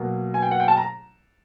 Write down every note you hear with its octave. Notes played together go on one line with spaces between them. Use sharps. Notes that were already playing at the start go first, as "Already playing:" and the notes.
Already playing: B2 F#3 A#3
G#5
G5
F#5
G5
A5
A#5